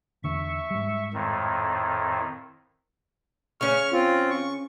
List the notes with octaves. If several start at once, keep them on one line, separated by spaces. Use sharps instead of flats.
E2 D3 E5 C#6
G#2 G3
F2 A2 D#3
C#3 C#4 C#6 F6
C4 F4
C#6